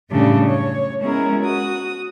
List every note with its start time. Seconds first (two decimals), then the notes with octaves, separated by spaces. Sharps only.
0.11 F#2 A2 C#3 G3 D4 A4
0.43 C#5
1.00 G#3 B3 C#4 E4 G#4 A#4
1.39 F#4 D#6